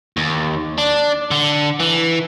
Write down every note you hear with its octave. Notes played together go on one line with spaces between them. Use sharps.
D#2
D4
D3
E3